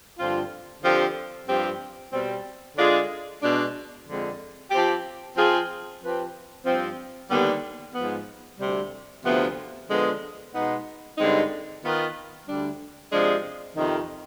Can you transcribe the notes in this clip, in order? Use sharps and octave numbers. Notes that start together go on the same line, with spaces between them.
G2 D3 F3 C4 F4
D3 F3 C4 G4
G2 F3 C4 G4
B2 G3 C4
D3 G#3 D4 F4 G#4
B2 G#3 D4
F2 D3 G#3 C4
F3 C4 G4
F3 C4 F4 G#4
F3 C4 G4 B4
G2 F3 C4
D#2 D3 G3 B3
G#2 F3 B3
D2 C3 G3
D2 C3 F3 B3
D3 F3 G#3 B3
B2 G#3 B3 D#4
G2 D3 G#3 C4 D#4
D#3 B3 F4 B4
D2 D3 G3 D4
C3 F3 G#3 D4 G#4
F2 C3 D#3